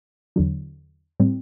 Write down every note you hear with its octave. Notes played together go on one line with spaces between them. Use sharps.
E2 D3 F#3
A2 G3 C4